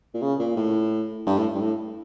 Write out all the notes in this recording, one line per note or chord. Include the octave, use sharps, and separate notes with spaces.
A#2
C#3
A#2
A2
G2
A2
G2
A2